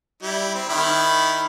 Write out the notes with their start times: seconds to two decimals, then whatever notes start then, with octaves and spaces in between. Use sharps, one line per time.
0.22 G3 E4
0.55 C4
0.69 D#3 E4 B5